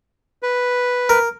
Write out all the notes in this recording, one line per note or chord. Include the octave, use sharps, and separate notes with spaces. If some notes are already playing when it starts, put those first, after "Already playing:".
B4
A#4